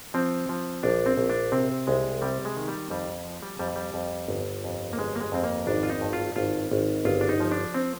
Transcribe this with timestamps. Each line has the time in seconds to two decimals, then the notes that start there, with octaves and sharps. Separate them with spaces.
0.14 F3 C4
0.49 F3
0.83 A#1 D4
1.06 C4
1.17 A#1
1.30 D4
1.52 C3 C4
1.87 C2 G#3
2.22 C3 G3
2.45 G#3
2.57 D#3
2.68 G3
2.90 F2 G3
3.25 F3
3.42 G3
3.59 F2 G3
3.76 G3
3.94 F2
4.28 G1
4.64 F2
4.93 A#3
4.98 G1 G#3
5.16 A#3
5.21 G#3
5.32 F2 C4
5.44 A#3
5.67 G#1 D4
5.83 F4
5.90 D#4
6.01 G2
6.13 F4
6.36 G#1 F4
6.71 G#1
7.05 G1 F4
7.21 D4
7.29 D#4
7.40 F3
7.51 D4
7.74 C4